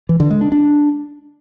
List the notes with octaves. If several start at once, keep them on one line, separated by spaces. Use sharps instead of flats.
E3
D3
G#3
D4
D4